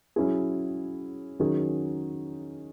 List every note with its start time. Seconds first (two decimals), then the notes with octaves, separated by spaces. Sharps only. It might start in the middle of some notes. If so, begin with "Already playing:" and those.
0.16 F#3 C#4 E4 G#4
1.39 D#3 F#3 C#4 G#4